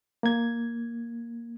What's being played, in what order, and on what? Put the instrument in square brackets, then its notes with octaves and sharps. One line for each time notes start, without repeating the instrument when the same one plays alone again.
[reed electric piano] A#3 G#6